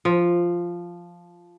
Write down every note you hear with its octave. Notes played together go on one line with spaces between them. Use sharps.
F3